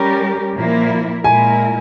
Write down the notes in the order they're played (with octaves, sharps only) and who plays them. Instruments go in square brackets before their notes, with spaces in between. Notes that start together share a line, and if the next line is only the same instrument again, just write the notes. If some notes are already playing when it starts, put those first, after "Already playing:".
Already playing: [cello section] G3 C#4 G4 A#4 [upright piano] A#5
[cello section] A#2 F3 A#3 E4 A#4
[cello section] A#2 G#3 E4 A#4 [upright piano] G#5